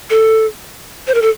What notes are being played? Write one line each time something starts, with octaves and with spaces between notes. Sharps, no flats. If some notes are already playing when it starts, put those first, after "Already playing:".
A4
C5
A#4
A4